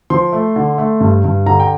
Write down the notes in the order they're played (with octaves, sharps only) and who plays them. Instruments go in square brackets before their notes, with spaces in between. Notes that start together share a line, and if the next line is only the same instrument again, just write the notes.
[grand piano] F3 C6
A3
D3
A3
G2
G2
D3 A#5
G5